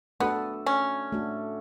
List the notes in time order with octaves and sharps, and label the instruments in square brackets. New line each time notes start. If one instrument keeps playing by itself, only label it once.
[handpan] A3 D4 F#4 A4 [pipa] B3
[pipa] C#4
[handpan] A3 D4 F#4 A4